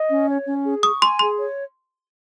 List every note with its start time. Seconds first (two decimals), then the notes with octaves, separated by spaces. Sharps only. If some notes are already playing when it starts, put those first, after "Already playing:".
Already playing: D#5
0.11 C#4
0.29 C#5
0.47 C#4
0.65 G#4
0.83 C#6 D#6
1.01 G#5 C6
1.19 G#4 C6
1.38 C#5